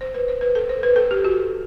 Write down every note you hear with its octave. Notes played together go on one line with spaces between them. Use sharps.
C5
B4
C5
B4
A4
C5
B4
A4
G4
F#4